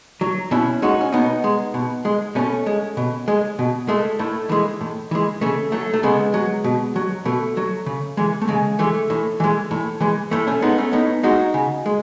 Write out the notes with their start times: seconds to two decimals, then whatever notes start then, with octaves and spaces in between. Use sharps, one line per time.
0.21 F#3
0.51 B2 C#4 E4
0.82 G#3 D#4 F#4
1.01 C#4
1.13 B2 B3 D#4
1.44 G#3
1.74 B2
2.05 G#3
2.35 B2 A3 C#4
2.66 G#3
2.97 B2
3.28 G#3
3.59 B2
3.88 G#3 A3
4.19 A2 A3
4.49 E3 G#3
4.81 A2
5.11 E3 G#3
5.41 C#3 A3
5.72 F#3 A3
5.94 A3
6.03 C#3 G#3 B3
6.34 F#3
6.64 B2
6.96 F#3
7.25 B2 A3
7.57 F#3
7.86 C#3
8.17 E3 G#3
8.42 A3
8.48 C#3 G#3
8.79 E3 G#3 A3
9.10 A2
9.40 E3 G#3
9.71 A2
10.01 E3 G#3
10.31 A2 A3
10.47 A3 C#4
10.62 G#3 B3 D#4
10.78 A3 C#4
10.93 A2 B3 D#4
11.23 G#3 D#4 F#4
11.54 C#3
11.86 G#3